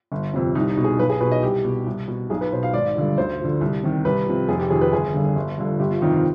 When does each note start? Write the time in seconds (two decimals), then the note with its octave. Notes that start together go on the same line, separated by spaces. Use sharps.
0.12 G1
0.34 F2 C3
0.55 C2 D#4
0.70 D#4
0.77 B2
0.84 G#4
0.99 B1 B4
1.10 G#4
1.21 B2 B4
1.32 D#5
1.43 C2 G4
1.64 B2
1.87 C2
2.08 B2
2.30 B1 G#4
2.41 B4
2.52 B2 C5
2.63 F5
2.73 G#1 D5
2.96 G2 D3 F3
3.18 D2 C5
3.39 D3 F3
3.61 C2
3.83 C3 D#3
4.05 C2 B4
4.27 C3 F3
4.49 F1 G#4
4.59 G4
4.70 F2 D#3 G#4
4.81 B4
4.92 G1 G#4
5.14 G2 D3
5.36 G1
5.58 G2 D3 F3
5.80 G1 G4
5.90 F4
6.01 F2 C3 D#3 D#4
6.13 F4